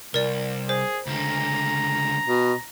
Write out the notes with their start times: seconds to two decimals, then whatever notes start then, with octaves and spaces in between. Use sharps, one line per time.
0.14 C2 A#4 D5
0.69 G#4 C5
1.07 C#2 D3 A#5
2.28 B2